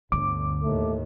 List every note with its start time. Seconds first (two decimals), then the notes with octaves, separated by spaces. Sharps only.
0.12 G1 D2 D3 D6
0.63 D#2 A2 A3